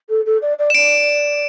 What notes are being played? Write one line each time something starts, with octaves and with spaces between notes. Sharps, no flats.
A4
A4
D5
D5
E7
D5 D7